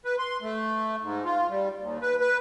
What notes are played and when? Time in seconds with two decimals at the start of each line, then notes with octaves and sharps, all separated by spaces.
0.05 B4
0.19 C6
0.42 A3
1.02 G#2
1.25 F4
1.50 G3
1.79 D#2
2.02 B4
2.20 B4